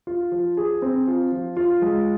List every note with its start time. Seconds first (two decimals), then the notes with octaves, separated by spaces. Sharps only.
0.07 F4
0.32 F3
0.57 G#4
0.82 C4
1.08 F4
1.32 F3
1.57 F4
1.82 G#3